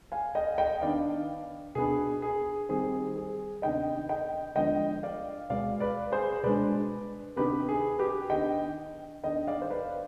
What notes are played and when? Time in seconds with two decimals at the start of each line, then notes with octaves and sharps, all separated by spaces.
0.12 F5 G#5
0.35 D#5 G5
0.58 D#5 G5
0.81 D#3 B3 D4 D5 F5
1.75 B2 B3 D4 G#4
2.22 G#4
2.69 D#3 G3 C4 G#4
3.16 G#4
3.62 C3 D#3 B3 D4 D#5 G5
4.09 D#5 G5
4.56 D3 F3 G#3 B3 D4 D#5 G5
5.03 D5 F5
5.50 B2 G#3 B3 D5 F5
5.80 B4 D5
6.12 G#4 C5
6.43 B2 G#3 D4 B4 D5
7.36 C3 D#3 B3 D4 G4 B4
7.69 G#4
7.99 G4 B4
8.30 D#3 B3 D4 D#5 G5
9.23 D#3 B3 D4 D#5 G5
9.47 D5 F5
9.62 C5
9.70 B4 D5